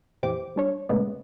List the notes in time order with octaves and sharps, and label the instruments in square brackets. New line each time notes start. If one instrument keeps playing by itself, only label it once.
[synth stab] A#1 F2 E3 G4 C5 D6
G3 D4 C#5
D#2 A#2 C#3 G#3 A3 B3